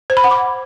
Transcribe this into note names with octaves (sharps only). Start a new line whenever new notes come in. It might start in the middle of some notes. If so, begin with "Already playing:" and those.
C5
B5
F#5
D6